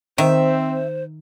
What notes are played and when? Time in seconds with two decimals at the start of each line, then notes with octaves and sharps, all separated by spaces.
0.18 D#3 C4 C5 E5